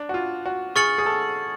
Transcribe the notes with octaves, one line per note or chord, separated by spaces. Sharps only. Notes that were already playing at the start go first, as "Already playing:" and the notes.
Already playing: D4
F#4
F4
F#4
G#4 C#6 F6 A6 C#7 F#7
G#4
A4